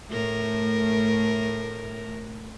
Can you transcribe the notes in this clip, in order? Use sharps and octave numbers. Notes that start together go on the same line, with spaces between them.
A2 A3 A#4